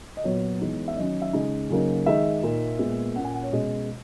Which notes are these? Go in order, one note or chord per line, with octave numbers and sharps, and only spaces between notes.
D#5
A#2 F#3 B3 C#5
E3 G#3 B3 D#4
E5
D#3 F#3 C#4 D#5
E5
C#3 G#3 D#4 D#5
C#3 F#3 A#3 D#4
D#3 G#3 D#4 E5
A#2 A#3 D#4
A#2 G#3 B3
A#2 A#3 C#4 F#5
G#5
F#5
C#5
B2 G#3 C#4 D#5